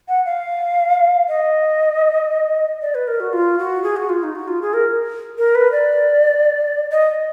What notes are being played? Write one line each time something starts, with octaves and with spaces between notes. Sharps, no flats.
F#5
F5
D#5
D5
B4
A#4
F#4
F4
F#4
G#4
F#4
F4
D#4
F#4
F4
G#4
A#4
A#4
B4
D5
D#5